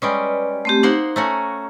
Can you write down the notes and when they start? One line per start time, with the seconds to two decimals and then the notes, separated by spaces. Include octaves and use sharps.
0.02 G3 G#3 C#4 B4 D5
0.65 A3 C4 G4
0.83 A#3 D#4 C5 F#5
1.16 A3 C#4 F#4 A#5